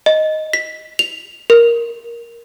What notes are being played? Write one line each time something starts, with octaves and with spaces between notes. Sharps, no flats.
D#5
B6
F7
A#4